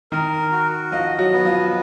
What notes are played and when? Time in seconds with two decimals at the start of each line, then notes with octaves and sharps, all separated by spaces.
0.12 D#3 D#4 A#4
0.52 F#4
0.92 F3 F4 D#5
1.18 F#3 F#4
1.32 B3
1.45 F3 F4